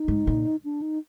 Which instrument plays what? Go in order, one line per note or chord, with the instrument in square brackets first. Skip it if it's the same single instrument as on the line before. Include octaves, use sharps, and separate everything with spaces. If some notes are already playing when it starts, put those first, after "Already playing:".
Already playing: [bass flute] D#4
[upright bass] G#2
A#2
[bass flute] D4
D#4